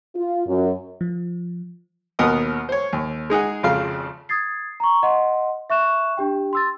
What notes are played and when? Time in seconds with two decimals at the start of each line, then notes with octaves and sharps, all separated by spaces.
0.15 F4
0.47 F#2
1.01 F3
2.19 D#2 B2 B3 A#4 D#5 D#6
2.69 C5 C#5
2.93 D#2
3.30 G#3 D#4 G#4 F#5
3.63 G#1 F2 C#3 F5
4.29 D#6 G#6 A6 C7
4.80 A#5 C#6
5.03 D#5 F#5 C6
5.70 E5 C#6 F#6 E7
6.17 D4 G4 G5
6.53 C6 E6 A6